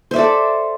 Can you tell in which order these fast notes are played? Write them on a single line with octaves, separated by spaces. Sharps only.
C5 E5 D5 A4